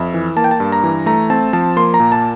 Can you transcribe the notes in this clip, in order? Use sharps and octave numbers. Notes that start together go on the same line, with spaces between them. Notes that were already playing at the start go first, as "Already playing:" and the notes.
Already playing: F2 E5
E3
A#3 A5
G5
A5
G2
A#5
E3
A3 A#5
C4 A5
F3 A5
A#3 C6
A#5
A#2
A5